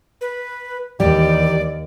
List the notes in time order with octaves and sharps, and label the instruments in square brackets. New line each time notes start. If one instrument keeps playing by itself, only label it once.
[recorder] B4
[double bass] D#2 [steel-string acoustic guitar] E3 G3 G4 [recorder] D5